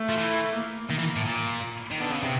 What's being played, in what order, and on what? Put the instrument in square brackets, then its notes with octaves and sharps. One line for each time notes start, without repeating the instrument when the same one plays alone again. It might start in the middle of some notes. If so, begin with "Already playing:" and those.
Already playing: [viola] A3
[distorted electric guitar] F3
E3
[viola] A#3
[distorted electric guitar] D#3
E3
A2
A#2
D#3
[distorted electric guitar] D3 [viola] B3
[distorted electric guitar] C#3
C3